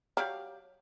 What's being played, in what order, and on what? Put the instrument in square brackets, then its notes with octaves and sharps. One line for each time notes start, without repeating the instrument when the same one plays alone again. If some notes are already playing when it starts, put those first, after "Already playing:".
[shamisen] F#3 [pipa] G4 D5 F5